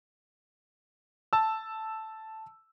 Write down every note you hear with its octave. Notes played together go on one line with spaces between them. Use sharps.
A5 E6